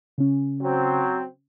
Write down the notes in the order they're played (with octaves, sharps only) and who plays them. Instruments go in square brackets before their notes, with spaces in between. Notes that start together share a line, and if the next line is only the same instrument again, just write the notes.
[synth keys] C#3 C#4
[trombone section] F#3 C4